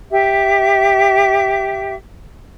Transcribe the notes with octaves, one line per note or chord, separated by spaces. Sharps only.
G4 E5